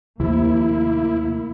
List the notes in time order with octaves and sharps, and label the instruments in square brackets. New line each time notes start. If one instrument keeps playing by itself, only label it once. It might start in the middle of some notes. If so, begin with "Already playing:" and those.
[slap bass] D#2 [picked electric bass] C3 F3 A3 [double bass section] A#3 [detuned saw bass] E4